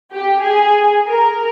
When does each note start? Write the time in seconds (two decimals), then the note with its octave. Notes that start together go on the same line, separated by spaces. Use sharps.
0.12 G4
0.41 G#4
1.08 A#4